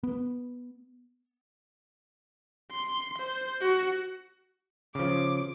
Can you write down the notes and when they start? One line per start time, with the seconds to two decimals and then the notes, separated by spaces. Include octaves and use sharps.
0.03 B3
2.71 C6
3.19 C5
3.61 F#4
4.95 C#3 F3 D6